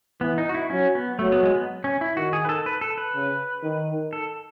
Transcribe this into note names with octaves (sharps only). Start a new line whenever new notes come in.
E3 B3
D#4
F#4
E4
F#3 C#4
B3
F#3 A3
B3
G#3
B3
C#4
E4
D#3 F#4
G#4
B4
A4
B4
A4
B4
C#3
D#3
A4